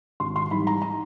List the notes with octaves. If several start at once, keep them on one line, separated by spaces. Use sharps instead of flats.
G#1 C6
C6
G#2 E3 G3 B5
A#5
A#5